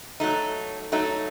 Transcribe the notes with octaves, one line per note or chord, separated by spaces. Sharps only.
F#3 A3 D#4
F#3 A3 D#4